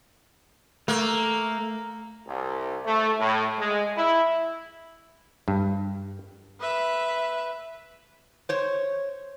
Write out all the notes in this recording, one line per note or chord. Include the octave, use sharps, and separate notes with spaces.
A3 A#3
C2
A3
A2
G#3
E4
G2
B4 E5
C5 C#5